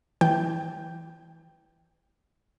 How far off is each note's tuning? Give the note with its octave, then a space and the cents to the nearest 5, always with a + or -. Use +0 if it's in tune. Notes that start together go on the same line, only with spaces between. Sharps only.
E3 +0 G5 +0